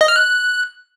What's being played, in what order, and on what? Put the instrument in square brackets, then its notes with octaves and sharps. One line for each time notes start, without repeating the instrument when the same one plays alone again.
[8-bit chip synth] D#5
F6
F#6